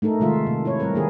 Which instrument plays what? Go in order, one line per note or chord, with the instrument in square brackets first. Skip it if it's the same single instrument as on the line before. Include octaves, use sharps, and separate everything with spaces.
[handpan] A3 D#4 A4 A#4
C3 D#3 G#3 A3 F4 E5
C3 A#3
E4 C#5
G3 C4 A#4 B4
D#3 A#3 G#4